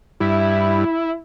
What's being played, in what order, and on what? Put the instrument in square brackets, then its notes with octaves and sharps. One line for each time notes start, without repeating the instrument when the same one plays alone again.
[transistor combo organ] G2 [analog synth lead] E4